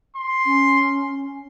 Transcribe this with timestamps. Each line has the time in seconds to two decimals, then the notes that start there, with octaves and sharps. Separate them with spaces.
0.16 C6
0.46 C#4